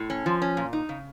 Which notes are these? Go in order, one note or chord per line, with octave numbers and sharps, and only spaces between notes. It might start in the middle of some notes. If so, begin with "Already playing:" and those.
Already playing: A2
C#4
F3
C#4
A#2
D#4
C#3